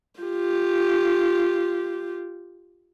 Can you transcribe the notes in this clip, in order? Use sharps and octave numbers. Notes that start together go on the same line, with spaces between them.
F4 G4